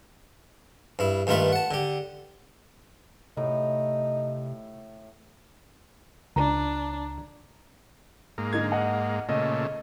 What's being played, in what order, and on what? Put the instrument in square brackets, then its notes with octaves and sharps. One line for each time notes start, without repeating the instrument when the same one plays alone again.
[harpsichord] G2 E4
G2 D#3 A3 F4 A#4 B4
F#5 A5
D3 G4
[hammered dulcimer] A2 [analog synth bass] C3 [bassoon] D#4
[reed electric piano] C#2 [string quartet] D4 [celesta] A#5
[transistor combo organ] G#2 A#3
[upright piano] D3 D#4 G#6
D#5 F#5
[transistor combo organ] A#2 C#3 A3 [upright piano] D#5